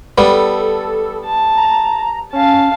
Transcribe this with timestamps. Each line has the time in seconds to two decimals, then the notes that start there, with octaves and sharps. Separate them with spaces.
0.18 G3 B3 A4
1.25 A5
1.57 A#5
2.33 C#4 F5 A5